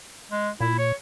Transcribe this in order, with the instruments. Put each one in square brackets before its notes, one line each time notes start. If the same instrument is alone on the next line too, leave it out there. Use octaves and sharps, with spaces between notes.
[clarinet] G#3
[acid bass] A#2 [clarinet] E4
[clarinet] C#5